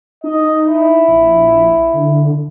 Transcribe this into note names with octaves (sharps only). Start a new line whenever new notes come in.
D#4 D#5
E4
A#1
D3